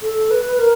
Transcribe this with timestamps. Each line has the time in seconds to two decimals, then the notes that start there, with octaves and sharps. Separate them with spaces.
0.02 A4
0.31 B4
0.59 A#4